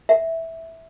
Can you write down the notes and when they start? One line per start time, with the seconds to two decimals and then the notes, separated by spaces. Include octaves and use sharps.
0.09 E5